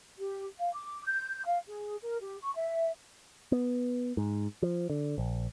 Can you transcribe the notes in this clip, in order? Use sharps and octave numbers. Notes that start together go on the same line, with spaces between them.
G4
F5
D6
G6
F5
G#4
A#4
G4
C#6
E5
B3
G#2
F3
D3
A#1